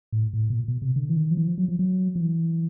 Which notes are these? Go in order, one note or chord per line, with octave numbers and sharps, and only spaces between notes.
A2
A2
B2
A#2
B2
C3
D3
E3
D#3
F3
E3
F3
F#3
F3
F#3
F3
E3